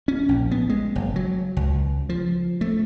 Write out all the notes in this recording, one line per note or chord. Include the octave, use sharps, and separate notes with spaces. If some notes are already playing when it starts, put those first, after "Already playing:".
C#4
A#1
B3
G#3
F#1
F#3
C#2
F3
A3